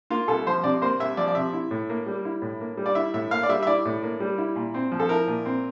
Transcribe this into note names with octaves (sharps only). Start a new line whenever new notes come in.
A#3 F4
C2 A4
F3 C5
C3 D5
A#3 C5
C2 E5
F3 D5
D5
C3 E5
E4
A2
A#3
G3
E4
A2
A#3
G3
D5
E4 E5
A2 E5
A#3 F5
D5
G3 E5
E5
E4 D5
A2
A#3
G3
E4
A#2
C4
F3
A4
E4 A#4
A#2
C4